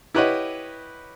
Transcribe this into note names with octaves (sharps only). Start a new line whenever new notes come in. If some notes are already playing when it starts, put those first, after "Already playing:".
E4 G4 B4 C#5 D#5 F#5